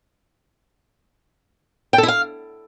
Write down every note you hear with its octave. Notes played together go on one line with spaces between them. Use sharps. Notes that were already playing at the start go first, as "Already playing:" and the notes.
G5
A4
E4
F5